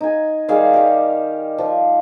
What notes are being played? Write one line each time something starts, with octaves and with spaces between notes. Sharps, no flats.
D#4 G#5
D#3 G3 G#4 F5
G3 G4
F3